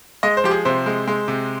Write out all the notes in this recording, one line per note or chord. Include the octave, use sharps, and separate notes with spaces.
G#3 D#5
C5
F3 G4
G#4
C3 C5
G#3
G#3
C3